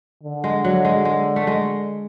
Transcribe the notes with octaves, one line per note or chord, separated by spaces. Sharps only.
D3
G#3
F#3
G#3
G#3
A3
G#3